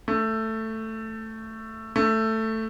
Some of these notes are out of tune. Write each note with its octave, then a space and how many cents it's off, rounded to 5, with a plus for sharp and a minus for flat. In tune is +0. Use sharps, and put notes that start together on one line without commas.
A3 +10
A3 +10